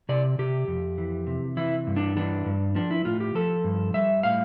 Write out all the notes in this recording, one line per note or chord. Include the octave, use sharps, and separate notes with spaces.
C3 D5
C3 G4
F2
E3
C3
E3 E4
G2
D4
E3 D4
G2
F3 D4
E4
A2 F4
G4
F3 A4
G2
G3 E5
A2 F5